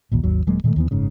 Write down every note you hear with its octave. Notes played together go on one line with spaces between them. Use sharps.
A1 D#2 A#2
G#1 D#2 F#3
D#1 F#3 G#3 A#3
A#2 D#3 G#3 A3
D#2 E3 B3
F#1 G#2 C#3